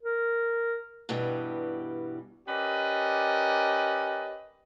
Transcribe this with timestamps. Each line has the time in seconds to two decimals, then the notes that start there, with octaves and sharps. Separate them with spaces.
0.03 A#4
1.09 G2 B2 E3 G3
2.48 C#4 G4 A#4 B4 D5 D#5